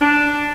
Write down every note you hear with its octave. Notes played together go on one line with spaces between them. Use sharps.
D4